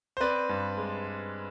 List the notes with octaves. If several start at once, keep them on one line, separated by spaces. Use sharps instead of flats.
C5
C4 B4 D5
G2
G#3